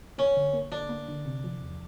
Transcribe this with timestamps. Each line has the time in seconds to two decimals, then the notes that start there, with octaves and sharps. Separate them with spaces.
0.18 A#3 C#4
0.37 D3
0.53 A#3
0.72 D3 D4
0.89 A#3
1.08 D3
1.26 C3
1.44 F3
1.61 E2